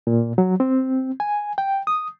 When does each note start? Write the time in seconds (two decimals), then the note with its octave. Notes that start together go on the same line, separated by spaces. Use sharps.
0.07 A#2
0.38 F#3
0.60 C4
1.20 G#5
1.58 G5
1.87 D#6